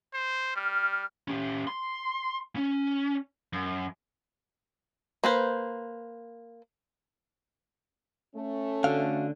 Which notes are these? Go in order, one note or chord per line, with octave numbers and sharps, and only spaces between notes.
C5
G3 F6
C#4 G4
C6
C#4
F#2
A#3 B4 C5
A3 C#4
D3 F#4 F5